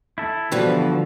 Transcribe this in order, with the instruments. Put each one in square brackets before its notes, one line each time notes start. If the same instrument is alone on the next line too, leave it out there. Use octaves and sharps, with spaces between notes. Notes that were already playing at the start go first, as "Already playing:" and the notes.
[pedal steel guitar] E4 A4
[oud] B2 E3 G3 [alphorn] D3 [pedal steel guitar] F3